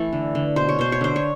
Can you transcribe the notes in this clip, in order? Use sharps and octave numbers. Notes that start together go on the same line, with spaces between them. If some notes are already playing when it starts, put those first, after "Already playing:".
Already playing: E3 A3 A4
D3
D3
B2 C5
C#5
B2 C5
C#5
D3 C5
C#5